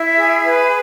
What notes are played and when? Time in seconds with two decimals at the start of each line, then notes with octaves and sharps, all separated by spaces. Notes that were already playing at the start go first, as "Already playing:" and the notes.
Already playing: E4 E5
0.17 G#4
0.44 B4